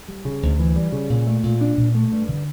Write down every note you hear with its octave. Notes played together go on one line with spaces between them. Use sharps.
G3
C#3
D2
E3
G3
C#3
A#2
A3
A#2
D4
A#2
A3
G2
D3